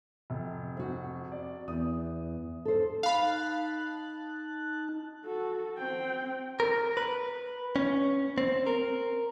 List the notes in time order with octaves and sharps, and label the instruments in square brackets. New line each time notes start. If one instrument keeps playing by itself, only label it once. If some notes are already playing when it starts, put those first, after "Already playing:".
[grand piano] F1
[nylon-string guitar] C4 F#4
[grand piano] D5
[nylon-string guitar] E2 [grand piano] D#6
[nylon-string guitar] A4 C5
[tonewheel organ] D#4 A5 F#6 [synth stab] F5 B5
[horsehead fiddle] F#4 A4
C4 G5
[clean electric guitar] A#4
B4
C#4
C4
A#4